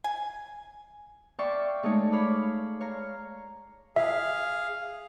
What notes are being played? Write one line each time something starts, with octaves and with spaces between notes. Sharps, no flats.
G#5
D5 E5 F5 G5 C6 C#6
G#3 A3 D#4 C#5
C#5 F5 B5 D6
C#5 F5 A#5
G#4 E5 F5